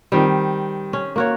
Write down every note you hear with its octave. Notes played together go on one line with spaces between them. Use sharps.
D#3 G3 C4
C#4
A#3 F#4 C#5